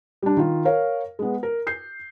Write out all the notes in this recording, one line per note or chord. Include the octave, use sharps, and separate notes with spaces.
G3 D4
D#3 F4
A#4 C#5 F5
G#3 B3
A#4
G6 C7